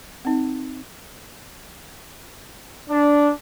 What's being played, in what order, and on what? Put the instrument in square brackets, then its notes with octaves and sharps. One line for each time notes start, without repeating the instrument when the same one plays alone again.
[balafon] C4 D#4
[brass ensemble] D4